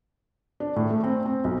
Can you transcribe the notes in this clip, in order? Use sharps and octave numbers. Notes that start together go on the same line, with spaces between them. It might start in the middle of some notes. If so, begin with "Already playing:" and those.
D4
A2
A3
C4
C4
B1